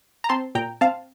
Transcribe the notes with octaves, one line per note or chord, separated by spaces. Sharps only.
A#5
C4 A5 C6
A#2 G5 A#5
C4 F5 A5